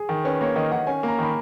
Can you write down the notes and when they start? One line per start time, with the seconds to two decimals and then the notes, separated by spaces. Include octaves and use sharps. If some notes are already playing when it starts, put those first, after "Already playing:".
Already playing: G#4
0.09 D#3
0.25 C#4 B4
0.41 A#3 C#5
0.56 D#3 D#5
0.72 D#3 F#5
0.87 C#4 G#5
1.03 A#3
1.08 A#5
1.19 D#3 B5